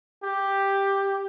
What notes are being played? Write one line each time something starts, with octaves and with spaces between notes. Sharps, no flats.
G4